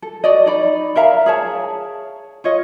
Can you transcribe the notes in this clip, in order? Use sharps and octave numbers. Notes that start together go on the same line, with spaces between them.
A4
F#4 D5 D#5
D#4 D5 B5
A#4 E5 F5 A#5
G#4 C#5 A5
F4 C#5 D#5